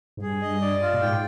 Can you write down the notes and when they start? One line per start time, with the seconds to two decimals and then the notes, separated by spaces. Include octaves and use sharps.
0.17 G#2
0.21 G2 G#4
0.42 D#5
0.61 D5
0.81 F4
0.94 A#2
1.01 G#2 G5